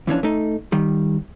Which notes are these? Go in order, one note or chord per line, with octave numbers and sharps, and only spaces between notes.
F2 E3 C#4 D4
A3 D#4
D#3 G3